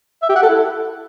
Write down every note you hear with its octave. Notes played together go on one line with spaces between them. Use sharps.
E5
G4
F#5
A4
E4